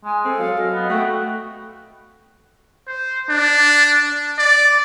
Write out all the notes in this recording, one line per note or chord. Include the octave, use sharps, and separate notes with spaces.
G#3 G#5
C4 A4
F#3 F5
D#5
B3
A3 F#4 G5
C5
D4
D5